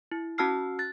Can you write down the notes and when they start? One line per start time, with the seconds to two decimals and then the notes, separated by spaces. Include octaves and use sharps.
0.12 E4
0.38 C#4 F#4 A5 E6 F6 C7
0.79 F#6 A6